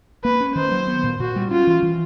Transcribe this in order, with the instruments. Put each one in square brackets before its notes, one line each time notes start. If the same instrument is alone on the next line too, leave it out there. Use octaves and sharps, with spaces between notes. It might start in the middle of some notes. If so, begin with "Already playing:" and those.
[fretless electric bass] A#3 [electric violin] B4
[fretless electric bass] C#4
[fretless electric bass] D#3 [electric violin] C5
[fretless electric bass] F#3
B3
A#2
[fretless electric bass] A#2 [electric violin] F#4
[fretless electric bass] G3
[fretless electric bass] C#4 [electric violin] F4
[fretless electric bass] E3
E3